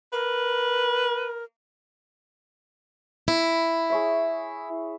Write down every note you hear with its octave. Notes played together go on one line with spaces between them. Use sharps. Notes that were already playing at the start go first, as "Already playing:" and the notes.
A#4 B4
E4
G#4 C#5 E5